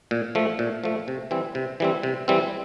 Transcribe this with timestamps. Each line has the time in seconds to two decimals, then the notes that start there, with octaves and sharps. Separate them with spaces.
0.11 A#2
0.35 F3 A3
0.59 A#2
0.84 F3 A3
1.08 C3
1.31 E3 G3 C4
1.55 C3
1.80 E3 G3 C4
2.03 C3
2.28 E3 G3 C4